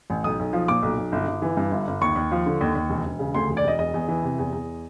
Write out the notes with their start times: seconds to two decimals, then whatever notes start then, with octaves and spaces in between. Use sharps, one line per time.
0.10 A1
0.24 B1 D#6
0.39 B1
0.53 F3
0.68 A#2 D6
0.82 B1
0.98 B1
1.12 G1
1.28 G1
1.42 E3
1.57 G2
1.71 G1
1.87 G1
2.01 D#2 C#6
2.16 D#2
2.31 F3
2.46 D3
2.61 D#2
2.75 D#2
2.90 E1
3.05 E1
3.19 C#3
3.34 D2 C6
3.49 E1
3.57 D5
3.63 E1 D#5
3.79 E2 D#5
3.94 E2
4.08 E3
4.23 C3
4.38 E2
4.53 E2